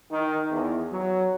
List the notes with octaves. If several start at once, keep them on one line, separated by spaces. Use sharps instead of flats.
D#3
E2
F#3